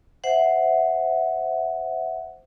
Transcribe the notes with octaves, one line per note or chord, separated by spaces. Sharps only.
C5 E5 F#5